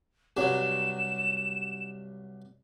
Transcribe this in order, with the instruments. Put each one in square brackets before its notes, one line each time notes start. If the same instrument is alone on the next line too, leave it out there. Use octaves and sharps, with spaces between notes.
[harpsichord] C2 G2 F#3 [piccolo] E7